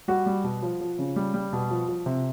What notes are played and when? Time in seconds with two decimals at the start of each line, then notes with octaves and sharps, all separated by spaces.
0.08 G3 F#4
0.26 G3
0.44 B2
0.63 F3
0.81 F3
0.99 C#3
1.16 G3
1.34 G3
1.53 B2
1.71 F3
1.88 F3
2.06 C3